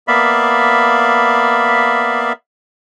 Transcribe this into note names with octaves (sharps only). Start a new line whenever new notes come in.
A#3 B3 D5 E5 F5 B5